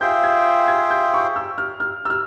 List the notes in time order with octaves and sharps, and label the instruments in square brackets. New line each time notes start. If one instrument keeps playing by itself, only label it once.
[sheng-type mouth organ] F4 G#4 C5 E5 G5 [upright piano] G6
[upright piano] G#6
G#6
G6
C#6
E6
F6
F6
E6
F6